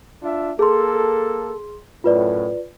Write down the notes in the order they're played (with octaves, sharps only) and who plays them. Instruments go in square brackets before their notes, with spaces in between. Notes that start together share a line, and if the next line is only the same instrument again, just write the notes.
[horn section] D4 F4 E5
[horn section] A#3 A4 [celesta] G#4 C6
[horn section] F#2 A2 [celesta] F4 B4 D5